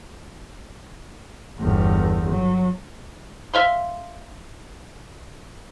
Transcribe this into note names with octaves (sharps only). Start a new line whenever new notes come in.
G1 E2
F#3
E5 F5 C6